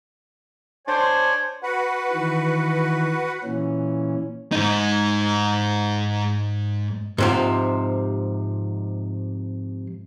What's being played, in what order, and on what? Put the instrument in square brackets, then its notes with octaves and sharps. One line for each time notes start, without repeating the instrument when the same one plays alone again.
[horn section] D4 C5 [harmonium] C#5 G#5
[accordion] F#4 B4 F#5
[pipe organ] D#3 E3
A#2 E3 C#4
[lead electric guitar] G#2 D#4
[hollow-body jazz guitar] G#2 C3 F3